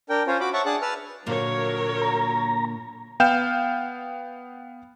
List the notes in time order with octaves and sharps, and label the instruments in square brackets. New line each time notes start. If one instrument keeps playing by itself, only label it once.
[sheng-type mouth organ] D4 A#4 G5
C#4 F4 C5 C#5
F#4 B5 D6
C#5 E5 F#5 A5 C#6
D4 G#4 F#5 A5 F#6
B4 A5 E6 F6
[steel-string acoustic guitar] A#2 D3 A#3 [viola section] F#3 A#4 C#5
[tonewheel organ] A#5
[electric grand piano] B3 F5 G5 F6 G6 E7